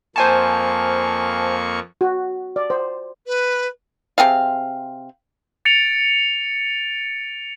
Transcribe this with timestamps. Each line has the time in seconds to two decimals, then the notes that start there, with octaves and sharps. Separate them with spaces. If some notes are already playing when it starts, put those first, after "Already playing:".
0.16 F2 A#3 C5 G#5 A5 C#6
2.01 F#4
2.56 D5
2.70 C5
3.26 B4
4.18 C3 C4 G#4 F5
5.65 A6 C#7 D7 F7